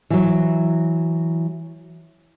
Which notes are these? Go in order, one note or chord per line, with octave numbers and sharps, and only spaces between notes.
E3 F#3